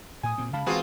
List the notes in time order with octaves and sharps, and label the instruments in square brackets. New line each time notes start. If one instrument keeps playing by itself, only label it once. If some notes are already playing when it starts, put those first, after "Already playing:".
[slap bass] A2 [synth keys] G#5 D#6
[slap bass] A#2 C4
[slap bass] C#3 G#3 [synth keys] F5 A5 B5
[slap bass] E3 G#3 [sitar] B3 F4 [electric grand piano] C4 F#4 G#4